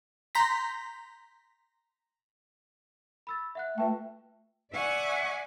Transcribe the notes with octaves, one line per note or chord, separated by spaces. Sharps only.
A#5 C6 G6 A#6 B6
B5 E6 A6
E5 F#5 F#6
A3 F4 B4 G5
D5 E5 F#5 G#5 C#6 D6